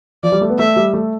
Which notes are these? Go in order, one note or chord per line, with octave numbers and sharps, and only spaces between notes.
F3 D5
G3
A3
B3
A3 E5
G3
A3